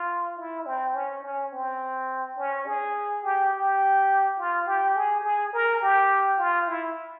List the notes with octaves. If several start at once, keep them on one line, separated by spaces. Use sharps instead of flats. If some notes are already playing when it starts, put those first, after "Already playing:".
Already playing: F4
E4
C4
C#4
C#4
C4
C#4
G#4
G4
G4
F4
G4
G#4
G#4
A#4
G4
F4
E4